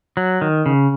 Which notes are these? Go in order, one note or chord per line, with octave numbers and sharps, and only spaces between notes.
F#3
D#3
C#3